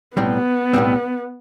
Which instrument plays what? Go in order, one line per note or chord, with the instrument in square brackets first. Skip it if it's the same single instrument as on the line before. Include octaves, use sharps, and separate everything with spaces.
[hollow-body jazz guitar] B1 A2 G3 C4 [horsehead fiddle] B3
[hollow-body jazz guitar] B1 A2 G3 C4